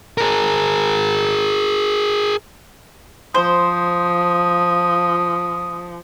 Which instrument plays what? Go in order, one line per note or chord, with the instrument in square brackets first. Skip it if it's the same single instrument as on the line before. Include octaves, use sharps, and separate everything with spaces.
[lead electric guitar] G#4 A#4
[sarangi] F3 [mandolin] C5 [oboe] D#6